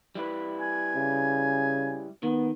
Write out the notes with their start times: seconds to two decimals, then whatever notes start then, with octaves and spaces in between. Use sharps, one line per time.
0.15 G3 E4 B4
0.61 G#5
0.95 C#3
2.23 D#3 B3